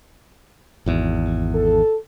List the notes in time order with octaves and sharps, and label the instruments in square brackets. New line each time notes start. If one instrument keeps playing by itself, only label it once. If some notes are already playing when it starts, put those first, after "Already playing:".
[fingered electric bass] G#1 E2
[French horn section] A4